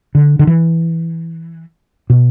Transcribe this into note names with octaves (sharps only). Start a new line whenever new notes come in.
D3
D3
E3
B2